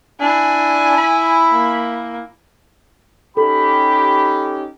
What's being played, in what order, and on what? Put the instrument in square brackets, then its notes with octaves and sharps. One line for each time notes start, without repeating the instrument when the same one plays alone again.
[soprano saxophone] D4 [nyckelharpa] E4 [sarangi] G#5
[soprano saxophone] B5
[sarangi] A#3
[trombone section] C#4 D#4 G4 [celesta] A4 [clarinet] B5